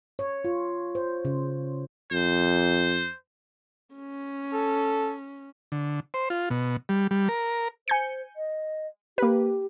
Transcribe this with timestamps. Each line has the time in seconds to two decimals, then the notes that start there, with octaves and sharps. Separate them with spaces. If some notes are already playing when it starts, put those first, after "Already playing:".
0.19 C#5
0.45 F4
0.95 C5
1.25 C#3
2.12 F2 C5
3.96 C#4
4.53 A4
5.72 D3
6.14 C5
6.30 F4
6.50 B2
6.89 G3
7.11 G3
7.29 A#4
7.88 C5 G#5 G6 C#7
8.36 D#5
9.18 A#3 G4 B4